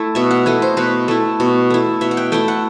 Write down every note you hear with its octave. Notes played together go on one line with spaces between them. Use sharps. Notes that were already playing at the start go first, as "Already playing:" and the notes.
Already playing: A3 E4
B2 E5
F#5
A3 E4 D#5
C5
B2 B4
A3 E4
B2
A3 E4
B2 E5
F#5
G5
A3 E4 G5
F#5